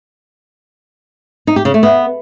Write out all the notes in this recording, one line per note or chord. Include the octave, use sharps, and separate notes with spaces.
D#4
G4
C#3
A3
B3